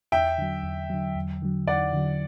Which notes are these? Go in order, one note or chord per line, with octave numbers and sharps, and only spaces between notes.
E2 E5 G5
D3 F#3
E2
D3 F#3
E2
D3 F#3
E2 D5 F#5
D3 F#3